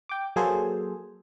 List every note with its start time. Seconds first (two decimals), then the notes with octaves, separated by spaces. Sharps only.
0.09 G5 D6
0.36 F#3 A#3 G#4 A4 C5